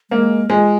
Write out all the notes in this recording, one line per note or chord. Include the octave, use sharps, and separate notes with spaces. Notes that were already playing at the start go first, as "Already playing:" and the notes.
G#3 A#3
G#3 F4